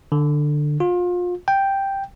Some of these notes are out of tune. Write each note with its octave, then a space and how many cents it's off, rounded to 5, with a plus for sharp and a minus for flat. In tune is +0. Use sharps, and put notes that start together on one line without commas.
D3 +15
F4 +30
G5 +0